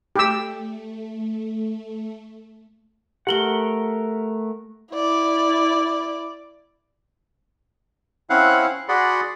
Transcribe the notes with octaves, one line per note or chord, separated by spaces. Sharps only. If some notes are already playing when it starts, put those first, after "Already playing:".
A3 G4 E6
A3 G4 A#4 F#5 F#7 G7
E4 D5
C4 C#4 E4 F5 F#5 F#6
F#4 G#4 D5 F#5 B5 C6